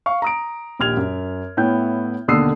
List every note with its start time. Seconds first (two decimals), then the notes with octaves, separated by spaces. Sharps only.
0.06 F5 C#6
0.22 A#5 D#6 D7
0.79 A#1 D#2 G4 F6 G#6 F7
0.97 F#2
1.57 A2 B3 E4 C#5 G5 G6
2.28 D#2 B2 D3 D#6 E6 C7